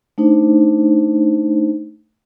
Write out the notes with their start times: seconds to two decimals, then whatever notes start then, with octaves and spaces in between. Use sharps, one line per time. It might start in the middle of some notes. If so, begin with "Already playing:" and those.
0.18 A3 D4 D#4 C5